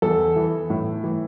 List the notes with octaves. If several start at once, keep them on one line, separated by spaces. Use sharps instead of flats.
E2 A4
E3
A2
E3